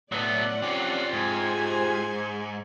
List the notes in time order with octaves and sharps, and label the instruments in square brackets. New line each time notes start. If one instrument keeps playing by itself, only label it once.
[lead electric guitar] A2 [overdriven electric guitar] F#3 B3 [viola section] D5 F#5
[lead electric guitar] C4 C#4 [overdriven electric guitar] F4 G4
[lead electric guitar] G#2 [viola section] G#4 C5 G#5